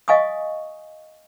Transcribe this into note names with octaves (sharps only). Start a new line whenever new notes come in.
D#5 F5 G#5 C#6 D#6